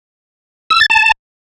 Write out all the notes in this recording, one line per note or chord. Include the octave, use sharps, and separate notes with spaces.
E6
A6
A5